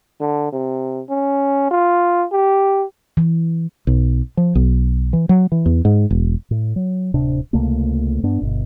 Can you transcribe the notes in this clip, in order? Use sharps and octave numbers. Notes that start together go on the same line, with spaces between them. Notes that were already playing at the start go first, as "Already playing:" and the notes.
D3
C3
C#4
F4
G4
E3
B1
F3
B1
E3
F#3
E3
E2
G#2
E1
A2
F#3
D1 C3 D4
C#2 C3 A3 A#3
G2 B3 D4
G1 B2